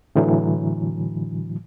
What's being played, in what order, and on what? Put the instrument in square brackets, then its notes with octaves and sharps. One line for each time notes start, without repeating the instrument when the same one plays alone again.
[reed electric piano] A2 D3 E3 F#3